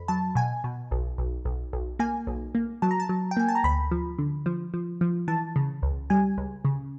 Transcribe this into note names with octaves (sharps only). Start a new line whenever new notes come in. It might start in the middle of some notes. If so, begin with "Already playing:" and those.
Already playing: F2 B5
F#3 A5
B2 G#5
B2
B1
B1
B1
B1
A#3 G#5
B1
A#3
F#3 A5
A#5
A5
F#3
G5
A#3 G#5
A5
A#5
D2 B5
F3
D3
F3
F3
F3
E3 A5
C#3
C#2
G3 G#5
C#2
C#3